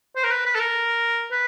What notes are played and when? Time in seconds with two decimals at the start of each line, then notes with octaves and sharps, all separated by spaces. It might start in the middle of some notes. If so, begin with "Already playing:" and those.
0.16 C5
0.24 A#4
0.31 B4
0.45 B4
0.55 A4
0.60 A#4
1.32 B4